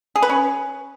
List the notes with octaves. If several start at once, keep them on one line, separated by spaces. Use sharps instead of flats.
G#4
B4
C#4